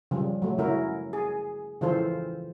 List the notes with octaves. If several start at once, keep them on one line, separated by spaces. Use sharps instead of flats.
C#3 F3 G3
F#3 A3
C#3 C#4 E4 F#4 A#4
G#4
C#3 E3 F3 F4 A4 C5